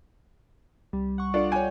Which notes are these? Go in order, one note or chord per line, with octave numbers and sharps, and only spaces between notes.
C2 G3
F#5 C#6
D4 F4 A4 D5
C#5 G5 G#5